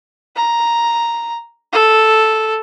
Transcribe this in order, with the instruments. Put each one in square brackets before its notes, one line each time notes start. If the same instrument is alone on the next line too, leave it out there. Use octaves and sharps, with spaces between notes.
[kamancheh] A#5
A4